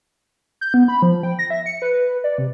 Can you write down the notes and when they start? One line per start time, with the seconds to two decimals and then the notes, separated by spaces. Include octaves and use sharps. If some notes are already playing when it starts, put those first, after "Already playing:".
0.61 G6
0.74 B3
0.88 B5
1.02 F3
1.23 G5
1.39 A#6
1.50 E5
1.66 C#7
1.82 B4
2.24 D5
2.38 C3